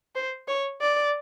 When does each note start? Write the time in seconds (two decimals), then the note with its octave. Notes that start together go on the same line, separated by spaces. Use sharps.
0.15 C5
0.48 C#5
0.81 D5